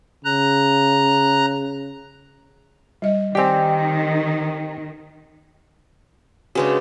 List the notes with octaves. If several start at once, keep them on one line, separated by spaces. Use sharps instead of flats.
C#3 A#5 F#6
G3 D#5
D#3 C4 G4 D5 G#5
C#3 G#3 D4 F#4 B4 C#5